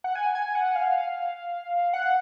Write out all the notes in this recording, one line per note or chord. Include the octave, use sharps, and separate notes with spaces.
F#5
G#5
G#5
F#5
F5
F#5